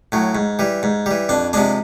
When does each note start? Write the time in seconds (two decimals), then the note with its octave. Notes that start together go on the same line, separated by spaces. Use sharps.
0.12 A2 F#3
0.35 G#2
0.59 E3 G3
0.83 G#2
1.06 E3 G3
1.29 F2 D4
1.53 C3 F3 G#3 D4